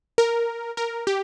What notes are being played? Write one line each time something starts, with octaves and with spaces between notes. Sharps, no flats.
A#4
A#4
G4